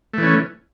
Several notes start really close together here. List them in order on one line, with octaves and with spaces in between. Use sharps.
A3 E3 C#4